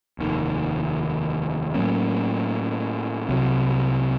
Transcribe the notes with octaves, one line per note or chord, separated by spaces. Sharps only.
F1 D#2 D#3
A2 F#3 A#3 C#4
C2 C3 F#3